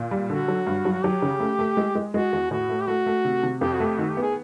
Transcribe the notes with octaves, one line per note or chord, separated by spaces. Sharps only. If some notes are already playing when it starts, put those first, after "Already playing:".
Already playing: A#2
G3
D3 F#4
F#3
G2
F#3
F#4
F#3 G4
C#3
A3
A3
G#3
G#3
G#3 F#4
E2
A2 F#4
A3
G4
A3 F#4
A3
C3
C3
F2 G4
F#4
A3 G4
D#3 F#4
G4
B3
G#4